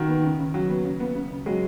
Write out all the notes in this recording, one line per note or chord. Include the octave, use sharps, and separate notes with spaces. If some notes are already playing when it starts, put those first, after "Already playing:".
Already playing: D#3 F#4
B3
C#3
C#3
C#3 F#3
B3
C#3
B3
C#3
C#3
F#3 G#3